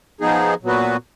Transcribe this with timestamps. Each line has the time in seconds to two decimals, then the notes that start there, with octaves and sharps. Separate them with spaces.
0.21 F3 B3 D#4 G#4
0.63 A#2 F#3 B3 F#4 B4